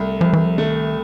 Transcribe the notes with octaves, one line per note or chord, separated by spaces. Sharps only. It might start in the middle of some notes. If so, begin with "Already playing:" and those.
Already playing: C2 A3
C2 F3
E3
F3
D#3 A3